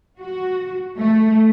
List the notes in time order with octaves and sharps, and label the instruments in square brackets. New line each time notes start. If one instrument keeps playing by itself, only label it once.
[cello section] F#4
A3